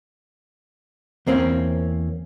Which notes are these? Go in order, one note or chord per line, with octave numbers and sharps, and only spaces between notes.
E2 A#3 C4 C#4